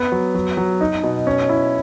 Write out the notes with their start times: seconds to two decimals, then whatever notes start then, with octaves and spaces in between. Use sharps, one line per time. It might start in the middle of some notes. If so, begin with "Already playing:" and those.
Already playing: B3
0.12 F#3
0.35 F#3
0.57 F#3
0.81 D#4
1.03 B2
1.27 C#4
1.49 E4